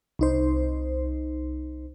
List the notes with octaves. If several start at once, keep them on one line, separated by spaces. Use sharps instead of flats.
C2 D#4 C5